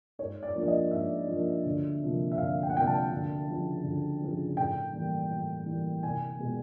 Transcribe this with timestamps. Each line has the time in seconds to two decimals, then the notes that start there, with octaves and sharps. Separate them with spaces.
0.19 G#2 C#5
0.43 D5
0.55 F3 A#3 D4 F4
0.63 D5
0.68 D#5
0.91 G#2 E5
1.28 F3 A#3 D4 F4
1.66 D2
2.02 C3 F3 A#3
2.32 E5
2.38 D2 F5
2.63 G5
2.70 F#5
2.74 C3 F3 A#3 G5
2.87 A5
3.12 D2
3.48 C#3 F3
3.84 D2
4.21 C#3 F3
4.57 A2 G5
4.93 E3 G3 A#3
5.31 A2
5.66 E3 G3 A#3
6.03 C2 G#5
6.39 B2 G#3 B3